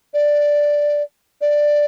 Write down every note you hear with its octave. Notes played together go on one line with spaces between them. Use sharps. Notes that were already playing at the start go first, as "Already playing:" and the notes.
D5
D5